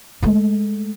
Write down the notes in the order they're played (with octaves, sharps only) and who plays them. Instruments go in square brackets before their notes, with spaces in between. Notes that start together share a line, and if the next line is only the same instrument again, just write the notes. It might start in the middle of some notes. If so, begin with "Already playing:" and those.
[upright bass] G#3 A3